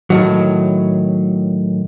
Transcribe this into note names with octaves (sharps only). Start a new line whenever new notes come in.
A2 D#3 F#3